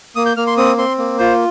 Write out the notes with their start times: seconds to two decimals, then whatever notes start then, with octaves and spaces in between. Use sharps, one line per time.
0.16 A#3 D#6
0.26 G6
0.37 A#3 F6
0.47 C6
0.57 C4 D#6
0.77 C4 C6
0.98 A#3
1.19 F4 C5